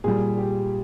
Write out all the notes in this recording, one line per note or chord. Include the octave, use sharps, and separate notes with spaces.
A#2 G3 G#4
G4